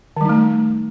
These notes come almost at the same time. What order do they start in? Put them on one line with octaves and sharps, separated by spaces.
D#3 G3 D#4 A3